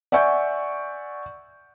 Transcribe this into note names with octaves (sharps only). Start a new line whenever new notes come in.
D5 E5 F#5 G#5 C#6 G6